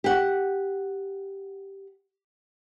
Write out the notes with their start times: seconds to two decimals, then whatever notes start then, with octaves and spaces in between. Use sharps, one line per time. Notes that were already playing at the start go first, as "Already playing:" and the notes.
0.04 G4 F#5